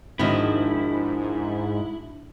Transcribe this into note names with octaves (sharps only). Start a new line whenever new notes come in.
G#2 D#3 F3 C4 D4 E4 F#4 D#5